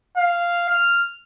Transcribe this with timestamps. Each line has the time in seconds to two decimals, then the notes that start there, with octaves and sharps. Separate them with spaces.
0.17 F5
0.69 F6